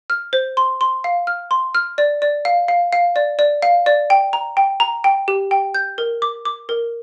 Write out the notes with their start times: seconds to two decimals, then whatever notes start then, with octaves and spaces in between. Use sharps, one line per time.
0.10 F6
0.33 C5
0.57 C6
0.81 C6
1.04 F5
1.27 F6
1.51 C6
1.75 F6
1.98 D5
2.22 D5
2.45 F5
2.68 F5
2.93 F5
3.16 D5
3.39 D5
3.62 F5
3.86 D5
4.10 G5
4.33 A#5
4.57 G5
4.80 A#5
5.04 G5
5.28 G4
5.51 G5
5.74 G6
5.98 A#4
6.22 D6
6.45 D6
6.69 A#4